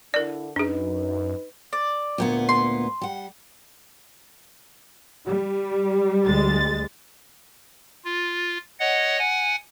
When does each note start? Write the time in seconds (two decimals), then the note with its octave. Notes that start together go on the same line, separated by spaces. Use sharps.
0.14 D3 D4 E4 A#4 D5
0.56 F#2 D4 D#4 G#4 B4
1.73 D5
2.18 D2 A#2 B3
2.49 C6
3.02 G3 F#5
5.25 G3
6.23 D2 G#3 A6
8.05 F4
8.80 C#5 D#5 F#5
9.19 F#5 G#5